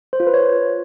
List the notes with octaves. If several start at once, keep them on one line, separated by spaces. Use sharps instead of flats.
C5
F4
B4
C#5